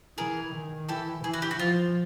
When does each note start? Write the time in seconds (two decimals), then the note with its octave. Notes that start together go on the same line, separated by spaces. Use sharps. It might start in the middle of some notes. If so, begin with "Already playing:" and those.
0.18 E3 G#4 A#4
0.54 D#3
0.89 E3 G4 A4
1.24 E3 G#4
1.34 F#4
1.42 G4
1.51 F#4
1.59 F3 F4